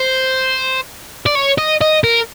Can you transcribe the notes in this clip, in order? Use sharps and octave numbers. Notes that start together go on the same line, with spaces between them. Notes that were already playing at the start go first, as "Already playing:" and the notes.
Already playing: C5
D5
C#5
D#5
D#5
A#4